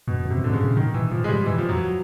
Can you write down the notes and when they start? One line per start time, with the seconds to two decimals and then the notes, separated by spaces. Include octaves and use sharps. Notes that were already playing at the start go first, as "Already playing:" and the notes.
0.08 F#2 B2
0.25 F#2 C3
0.38 G2
0.44 D3
0.51 G#2 C#3
0.64 A2
0.77 A#2 D#3
0.94 A2 E3
1.11 G#2 F3
1.24 G#3
1.29 G2 G3
1.46 G2 E3
1.58 F3
1.69 F2 F#3